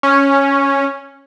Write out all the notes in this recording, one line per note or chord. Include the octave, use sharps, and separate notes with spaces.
C#4